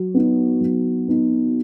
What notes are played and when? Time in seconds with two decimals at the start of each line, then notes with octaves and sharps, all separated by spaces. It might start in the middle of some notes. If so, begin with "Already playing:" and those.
Already playing: F#3
0.14 B3 D#4
0.61 F#3
1.08 B3 D#4